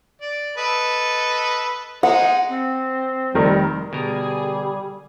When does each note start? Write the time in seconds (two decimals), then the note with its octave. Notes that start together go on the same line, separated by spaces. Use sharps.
0.22 D5
0.57 A4 B4 D#5
2.03 G#3 D#4 F#5
2.48 C4
3.34 F1 D#3 G3 A#4
3.93 B2 D3 G3 G#4 A#4